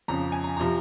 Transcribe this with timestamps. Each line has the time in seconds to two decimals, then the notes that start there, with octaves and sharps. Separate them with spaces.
0.08 F2 C#3 F3 A#5
0.32 G#5
0.44 A#5
0.57 C3 F3 A#5